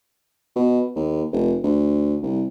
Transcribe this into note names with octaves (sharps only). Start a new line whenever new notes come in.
B2
D#2
F1
D2
C2